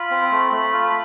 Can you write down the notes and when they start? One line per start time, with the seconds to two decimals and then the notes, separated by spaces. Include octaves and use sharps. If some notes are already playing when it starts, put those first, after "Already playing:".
Already playing: F4 B5
0.11 C4
0.32 A3
0.52 A3
0.73 F4